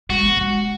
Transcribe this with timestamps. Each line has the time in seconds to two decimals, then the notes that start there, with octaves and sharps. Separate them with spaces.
0.09 G#3 F#4
0.23 B3
0.37 G#3